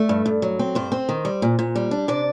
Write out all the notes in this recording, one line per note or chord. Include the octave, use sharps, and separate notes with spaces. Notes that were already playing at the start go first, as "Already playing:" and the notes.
Already playing: A3 D5
G2
G2
F#3
C4
G2 C5
C4
D#3
G3
A#2
A#2
G3
D4
C3 D5